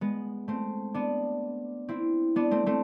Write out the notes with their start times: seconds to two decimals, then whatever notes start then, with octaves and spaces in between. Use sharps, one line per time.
0.01 G#3 B3
0.48 A3 C4
0.94 B3 D4
1.89 C4 E4
2.36 B3 D4
2.51 A3 C4
2.66 A3 C4